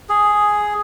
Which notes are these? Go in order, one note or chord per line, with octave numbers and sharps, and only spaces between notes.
G#4